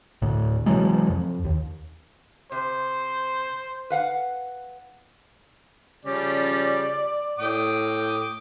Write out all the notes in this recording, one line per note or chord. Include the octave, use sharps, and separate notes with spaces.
D2 A2
C3 E3 F#3 G#3
F2
D#2
C3 C5
B4 F5 F#5
C#3 F3 G3 C#4 D5
A2 G5 D6 D#6